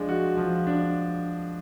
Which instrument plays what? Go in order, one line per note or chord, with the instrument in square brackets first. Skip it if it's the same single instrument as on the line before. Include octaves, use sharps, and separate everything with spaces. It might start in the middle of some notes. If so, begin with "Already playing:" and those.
Already playing: [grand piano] F3 G#3 D4
F#4
F3
D4